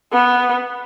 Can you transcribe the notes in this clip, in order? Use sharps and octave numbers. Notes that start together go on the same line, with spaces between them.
B3